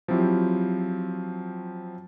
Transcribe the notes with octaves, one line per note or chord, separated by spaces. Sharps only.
F3 F#3 C4 E4 F4 G4